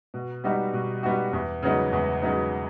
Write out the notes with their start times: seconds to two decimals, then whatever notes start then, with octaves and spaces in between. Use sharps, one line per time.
0.14 B2
0.44 G3 B3 D#4 F#4
0.73 B2
1.03 G3 B3 D#4 F#4
1.33 E2
1.63 C#3 F#3 B3 D#4
1.92 E2
2.22 C#3 F#3 B3 D#4